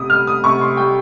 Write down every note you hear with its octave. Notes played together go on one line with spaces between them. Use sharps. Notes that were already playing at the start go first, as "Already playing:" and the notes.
Already playing: C3 D#6
G3 F6
D#6
C3 C#6
C6
G3 G5